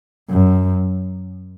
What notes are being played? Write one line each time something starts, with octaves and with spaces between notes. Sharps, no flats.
F#2